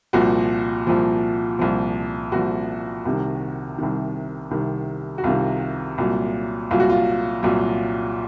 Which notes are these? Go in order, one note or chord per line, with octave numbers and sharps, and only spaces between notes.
C2 A#2 F3 F#4
C2 A#2 F3
C2 A#2 F3
C2 A#2 F3 F#4
C2 C3 D#3
C2 C3 D#3
C2 C3 D#3
F#4
C2 C3 D#3 F4
C2 A#2 F#3
C2 A#2 F#3 F4
F#4
F4
C2 A#2 F#3